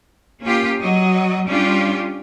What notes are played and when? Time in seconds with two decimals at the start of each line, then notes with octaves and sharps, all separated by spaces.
0.43 A#3 C#4 F4 G4
0.82 F#3 D#5
1.47 G3 C#4 D4 F4 G4